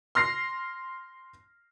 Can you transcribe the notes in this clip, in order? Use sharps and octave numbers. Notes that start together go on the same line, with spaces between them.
C6 F6 A#6 C7